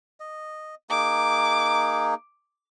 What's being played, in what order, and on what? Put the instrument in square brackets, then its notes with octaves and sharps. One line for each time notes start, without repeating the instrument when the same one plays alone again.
[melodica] D#5
[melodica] A#3 D#4 G#4 [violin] D6